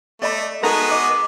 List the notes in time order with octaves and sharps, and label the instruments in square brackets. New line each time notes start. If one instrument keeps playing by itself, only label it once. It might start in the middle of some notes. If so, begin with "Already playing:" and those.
[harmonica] A3 [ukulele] D5 D#5 B5
[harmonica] G#3 B3 F#4 [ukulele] D#4 A4 [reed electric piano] A#4 A#5
[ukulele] D#5 [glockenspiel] D6